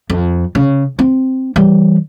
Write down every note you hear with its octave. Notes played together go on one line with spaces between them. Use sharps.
F2
C#3
C4
E3 G3